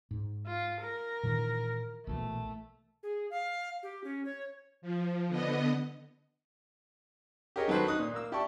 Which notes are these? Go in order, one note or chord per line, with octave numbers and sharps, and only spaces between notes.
G#2
F4
A#4
A#2 D#3 E3
A#1 B2 E3 A3
G#4
F5
G4
C#4
C#5
F3
D3 B3 D#5
G4 G#4 A#4 C#5 D#5
D#3 F#3 A4 B4 C5
D#4 D#6 F#6
A#2
A#3 E6
E4 G4 D5 A5 C#6